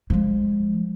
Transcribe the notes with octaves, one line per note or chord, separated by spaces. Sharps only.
F3 G#3